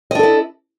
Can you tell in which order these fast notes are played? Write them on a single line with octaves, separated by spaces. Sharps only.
D#5 D4 A4 E4